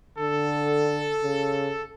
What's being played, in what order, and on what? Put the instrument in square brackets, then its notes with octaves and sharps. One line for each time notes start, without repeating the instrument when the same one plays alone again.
[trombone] D3 [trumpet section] A4
[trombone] C#3